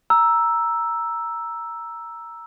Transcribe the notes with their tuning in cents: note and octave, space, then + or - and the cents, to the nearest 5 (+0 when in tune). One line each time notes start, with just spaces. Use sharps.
A#5 +5 E6 +0